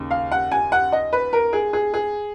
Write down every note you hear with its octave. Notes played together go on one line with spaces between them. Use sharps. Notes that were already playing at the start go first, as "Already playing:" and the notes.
Already playing: D#2 C#3
F5
F#5
G#5
F#5
D#5
B4
A#4
G#4
G#4
G#4